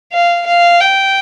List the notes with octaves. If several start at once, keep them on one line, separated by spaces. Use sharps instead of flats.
F5
F5
G5